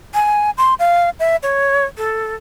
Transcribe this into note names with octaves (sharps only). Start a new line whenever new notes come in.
G#5
C6
F5
E5
C#5
A4